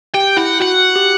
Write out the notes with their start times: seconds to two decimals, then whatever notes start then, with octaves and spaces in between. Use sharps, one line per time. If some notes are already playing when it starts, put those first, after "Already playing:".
0.14 G4 G5
0.37 E4 F#5
0.60 F#4 F#5
0.96 G4